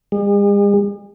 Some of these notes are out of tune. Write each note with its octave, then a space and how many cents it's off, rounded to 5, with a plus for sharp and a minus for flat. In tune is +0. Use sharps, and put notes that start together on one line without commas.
G#3 -45